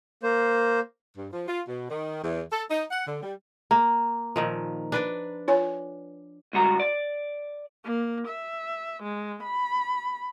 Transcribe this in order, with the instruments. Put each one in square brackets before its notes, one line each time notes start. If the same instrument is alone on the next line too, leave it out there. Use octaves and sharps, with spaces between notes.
[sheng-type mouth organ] A#3 C5
[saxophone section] G2
F3
F4
B2
D#3
E2
A4
D#4
F#5
D3
G3
[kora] A#3 [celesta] A#5
[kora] A#2 D#3 F3
D4 B4 D5
[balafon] F4 C#5 G#5
[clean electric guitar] C#2 G2 F#4 A#5
D5
[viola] A#3
E5
G#3
B5